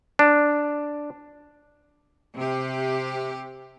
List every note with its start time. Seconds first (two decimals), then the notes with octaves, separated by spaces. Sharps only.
0.19 D4
2.37 C3 G4